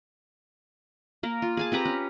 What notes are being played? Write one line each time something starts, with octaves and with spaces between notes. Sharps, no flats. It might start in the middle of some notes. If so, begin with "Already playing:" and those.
A#3 A#4
F4
G#4 G#5 A5
C4 G4 B4 A#5
C#4